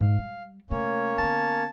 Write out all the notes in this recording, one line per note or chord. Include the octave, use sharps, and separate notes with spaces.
G#2 F5
G3
C3 A3 A#3 C#4 C#5
D3 B3 A5